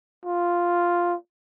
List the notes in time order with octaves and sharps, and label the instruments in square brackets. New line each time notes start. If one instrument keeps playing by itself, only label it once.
[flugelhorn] F4